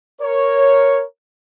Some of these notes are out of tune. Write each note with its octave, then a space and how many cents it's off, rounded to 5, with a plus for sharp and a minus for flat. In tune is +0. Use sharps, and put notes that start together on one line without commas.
A#4 +0 C#5 +0